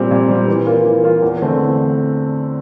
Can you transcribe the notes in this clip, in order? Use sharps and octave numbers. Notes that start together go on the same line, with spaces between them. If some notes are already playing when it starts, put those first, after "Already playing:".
Already playing: A#2 G3 C4
A#2
G3 C4
E3
A#3 F4
E3
A#3 F4
E2
D3 A3 C4
E2